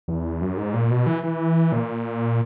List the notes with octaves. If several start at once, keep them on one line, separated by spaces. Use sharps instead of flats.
E2
F#2
G#2
A#2
B2
E3
E3
A#2